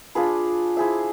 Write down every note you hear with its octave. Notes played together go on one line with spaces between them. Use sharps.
D4 F4 G#4 B4
E4 G#4 C5 E5